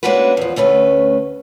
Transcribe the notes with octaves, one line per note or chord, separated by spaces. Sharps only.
G#3 A#3 C#4 D4 F#4 B4
E2 F3
D2 A3 C#4 B4